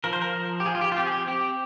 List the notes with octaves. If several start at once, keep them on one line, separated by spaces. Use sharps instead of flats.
F3 A#4
C5
A#4
F3
G4
F3 G#4
F4
G4
F4
C4 G4
G#4
G4
C4 G4